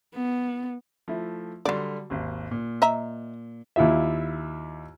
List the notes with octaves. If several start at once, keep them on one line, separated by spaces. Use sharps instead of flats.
B3
F3 A3 E4
D3 F#3 G3 D5 C6
G#1 D#2
A#2
D#5 E5 A#5
D#2 E4 F4 E5